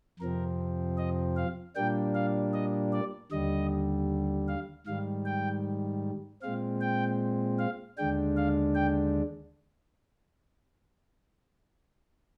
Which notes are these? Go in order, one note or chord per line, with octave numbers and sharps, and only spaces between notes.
F2 C3 F3 C4 A#4
D#5
F5
A#2 G3 A#3 D4 G5
F5
D#5
D5
D#2 D3 G3 D#5
F5
G#2 D#3 G3 F5
G5
A#2 G#3 C4 F5
G5
F5
D#2 D3 G#3 D4 G5
F5
G5